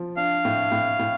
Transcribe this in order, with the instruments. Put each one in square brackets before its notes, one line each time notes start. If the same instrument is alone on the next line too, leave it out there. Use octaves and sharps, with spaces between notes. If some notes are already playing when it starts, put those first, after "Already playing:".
Already playing: [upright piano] F3 F4
[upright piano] D4 [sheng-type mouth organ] F5
[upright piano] A2
A2
A2